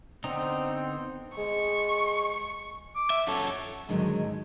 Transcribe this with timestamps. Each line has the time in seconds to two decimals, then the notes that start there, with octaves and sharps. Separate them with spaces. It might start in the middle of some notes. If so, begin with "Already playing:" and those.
0.24 D3 B3 C4 D#4
1.38 G#3 C#6
2.95 D6
3.10 E5
3.28 F#2 A4 C#5
3.88 G#2 D3 D#3 F#3 G#3